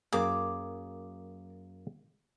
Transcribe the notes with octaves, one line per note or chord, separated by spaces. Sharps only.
F#2 A#3 G#4 D6